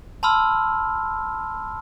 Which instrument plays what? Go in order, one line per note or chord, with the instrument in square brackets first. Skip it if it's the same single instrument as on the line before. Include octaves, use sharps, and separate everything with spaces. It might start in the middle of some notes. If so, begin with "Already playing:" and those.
[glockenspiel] A5 B5 C6 E6 F6